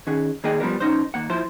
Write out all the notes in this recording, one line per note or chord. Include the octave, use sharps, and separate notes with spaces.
D#3 C#4 G#4 F#5
D#3 A#3 G#4 D5 D#5 G5
F3 G3 A3 B3 D4 A#4
B1 C#4 D#4 C5
D#2 A#3 F#5
F3 E4 C5